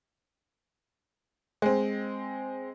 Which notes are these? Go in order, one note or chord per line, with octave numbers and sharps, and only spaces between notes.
G#3 C4